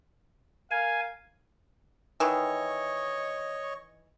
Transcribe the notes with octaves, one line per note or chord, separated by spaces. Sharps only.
A#4 F5 G#5
D#3 E3 C#5 D#5 C#6